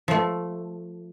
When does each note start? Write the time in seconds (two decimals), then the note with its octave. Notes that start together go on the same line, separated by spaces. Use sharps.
0.08 F3 A3